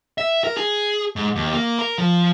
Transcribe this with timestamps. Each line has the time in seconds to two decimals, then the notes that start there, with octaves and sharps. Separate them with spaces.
0.18 E5
0.44 A#4
0.57 G#4
1.16 G#2
1.35 D#2
1.54 A#3
1.79 A#4
1.98 F3